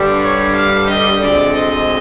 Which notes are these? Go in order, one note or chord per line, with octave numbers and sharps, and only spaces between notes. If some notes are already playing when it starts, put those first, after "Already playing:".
Already playing: G2 D3 G3
C#5
F5
D#5
D2 D3 F3 G#3 C4 D5
D#5